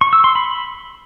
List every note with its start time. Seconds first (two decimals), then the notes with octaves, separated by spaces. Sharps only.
0.01 C#6
0.13 E6
0.24 C6
0.35 B5